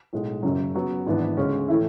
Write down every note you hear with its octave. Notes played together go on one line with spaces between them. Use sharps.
B1 A2 G#3
F#1 F#2 C#3 F#3
C#3 F#3 B3 F#4
G#1 G#2 E3 B3 D4
D2 C#3 G#3 C#4
A2 E3 A3 E4